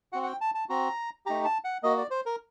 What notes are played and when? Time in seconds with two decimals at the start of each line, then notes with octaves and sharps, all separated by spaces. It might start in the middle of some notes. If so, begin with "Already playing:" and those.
0.12 C4 F#4 F#5
0.23 F#5
0.26 G5
0.41 A5
0.55 A5
0.69 C4 F#4 A#5
1.26 A3 D#4 G4 A#5
1.45 A5
1.64 F#5
1.83 A#3 F#4 D#5
1.97 D5
2.11 C5
2.26 A#4